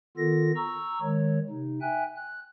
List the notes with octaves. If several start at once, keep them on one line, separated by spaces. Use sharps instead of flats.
D#3 B3 F4 A4 A#6
A#5 C#6 E6
D#3 G#3 C#5
C3 D#4
E5 G5 G#5 F#6
F#6